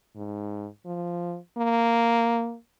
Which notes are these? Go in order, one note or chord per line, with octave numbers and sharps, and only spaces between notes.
G#2
F3
A#3